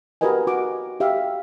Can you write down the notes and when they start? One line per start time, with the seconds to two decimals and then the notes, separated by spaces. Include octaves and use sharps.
0.21 F#4 G4 A#4 B4 D#5 G#5
0.47 F#4 D6
1.00 G4 E5 F5